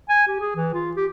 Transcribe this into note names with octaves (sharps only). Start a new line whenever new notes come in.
G#5
G4
G#4
E3
F4
G4